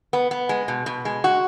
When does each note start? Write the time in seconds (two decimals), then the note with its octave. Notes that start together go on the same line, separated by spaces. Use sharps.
0.13 B3
0.31 B3
0.49 G#3
0.68 B2
0.86 B2
1.05 G#3
1.24 F#4